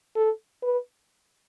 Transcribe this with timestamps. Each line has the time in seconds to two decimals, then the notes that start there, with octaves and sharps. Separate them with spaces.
0.16 A4
0.63 B4